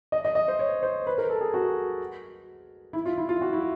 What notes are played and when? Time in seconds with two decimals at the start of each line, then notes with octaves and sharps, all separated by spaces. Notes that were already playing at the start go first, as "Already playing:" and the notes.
0.12 D#5
0.25 D#5
0.35 D#5
0.48 C5
0.59 C#5
0.83 C5
1.07 B4
1.18 A#4
1.30 A4
1.41 G#4
1.54 F#4
2.93 E4
3.05 F4
3.18 E4
3.29 F4
3.41 F#4
3.53 E4